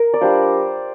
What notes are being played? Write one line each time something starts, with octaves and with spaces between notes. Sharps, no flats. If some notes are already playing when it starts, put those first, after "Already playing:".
Already playing: A#4
D5
G3 D4 F4 C5